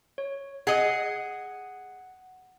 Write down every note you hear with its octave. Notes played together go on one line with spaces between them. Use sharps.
C#5
G#4 D#5 F#5